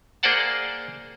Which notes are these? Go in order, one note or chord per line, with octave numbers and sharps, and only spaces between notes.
A#3 G#4 C5 D5 F#5 A5